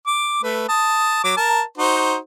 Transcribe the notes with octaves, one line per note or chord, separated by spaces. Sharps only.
D6
A3 B4
A5 D#6
F#3 D6
A#4 A5
D#4 F#4 C5